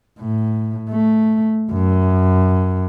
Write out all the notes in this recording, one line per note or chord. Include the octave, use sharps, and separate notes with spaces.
A2
A3
F#2